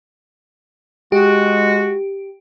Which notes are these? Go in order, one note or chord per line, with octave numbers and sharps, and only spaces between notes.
G#3 F#4 G4